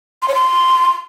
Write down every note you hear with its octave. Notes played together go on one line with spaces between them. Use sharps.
C6
C#5
C6